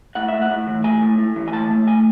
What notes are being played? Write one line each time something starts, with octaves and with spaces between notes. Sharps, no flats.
A2 F#5
A2 E5
F#5
A2
E3
A3 G#5
A2
A2
E3
G#5
A2 A5
A3
A2 G#5